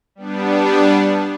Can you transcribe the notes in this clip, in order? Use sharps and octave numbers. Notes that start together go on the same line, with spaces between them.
G3 B3 D4